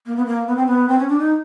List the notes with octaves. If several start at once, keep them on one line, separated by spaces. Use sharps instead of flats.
A#3
B3
A#3
B3
C4
B3
C4
C#4
D4
D#4